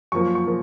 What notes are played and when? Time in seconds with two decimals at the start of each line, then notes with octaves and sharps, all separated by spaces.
0.12 F#2 F3 A#3 C#6
0.35 C#6
0.47 F3 A#3